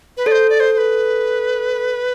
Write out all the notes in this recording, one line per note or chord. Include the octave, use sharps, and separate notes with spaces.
B4
A4 D5
C5
D5
C5
C5
B4